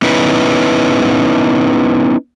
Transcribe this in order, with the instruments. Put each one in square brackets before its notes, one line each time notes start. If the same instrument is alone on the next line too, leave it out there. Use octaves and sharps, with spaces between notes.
[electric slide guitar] B3 C#4 D#4 E4 B4